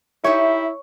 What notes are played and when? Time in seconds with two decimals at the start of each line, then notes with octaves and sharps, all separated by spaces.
0.24 D#4 E4 G4 C#5 E5